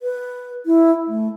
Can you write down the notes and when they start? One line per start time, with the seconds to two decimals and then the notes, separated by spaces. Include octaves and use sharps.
0.01 B4
0.66 E4
1.07 A3